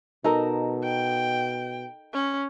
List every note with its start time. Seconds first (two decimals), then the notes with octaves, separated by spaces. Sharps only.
0.24 B2 D#4 A4 A#4
0.84 G5
2.14 C#4